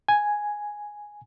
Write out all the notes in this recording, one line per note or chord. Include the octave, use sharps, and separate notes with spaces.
G#5